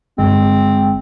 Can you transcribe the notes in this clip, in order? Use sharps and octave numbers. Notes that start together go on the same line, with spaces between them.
G1 G#3 C4